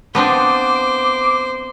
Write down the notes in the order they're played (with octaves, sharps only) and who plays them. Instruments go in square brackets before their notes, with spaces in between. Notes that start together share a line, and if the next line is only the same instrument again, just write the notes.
[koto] F3 C4 D4 [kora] B3 [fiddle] C5 [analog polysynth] D6